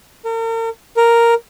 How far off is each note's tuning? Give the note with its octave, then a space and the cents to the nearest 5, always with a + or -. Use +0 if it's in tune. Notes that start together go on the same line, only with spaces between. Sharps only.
A#4 -40
A#4 +0